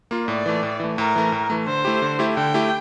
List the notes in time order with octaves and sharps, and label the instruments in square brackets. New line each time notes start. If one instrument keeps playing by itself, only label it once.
[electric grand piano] A#3 F4
[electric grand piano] A2 [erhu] D5
[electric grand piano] E3 A3
A2
E3 A3
[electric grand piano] A2 [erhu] A#4
[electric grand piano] E3 A3
A2
E3 A3
[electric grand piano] D3 [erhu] C5
[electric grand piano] A3 E4 G4
D3
A3 E4 G4
[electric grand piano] D3 [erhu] G5
[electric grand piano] A3 E4 G4